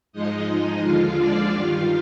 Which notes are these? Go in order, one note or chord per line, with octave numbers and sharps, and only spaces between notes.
G#2 F3 G#3 D#4 D#5
D#2 D3 F3 G#3 F4 F5
D4 D5
G2 D#3 G3 F4 F5